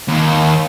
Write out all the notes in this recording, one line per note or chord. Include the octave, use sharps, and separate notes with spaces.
D#2